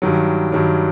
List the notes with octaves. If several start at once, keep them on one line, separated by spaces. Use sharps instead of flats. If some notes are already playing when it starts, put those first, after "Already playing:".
G2 D#3 F#3
G2 D#3 F#3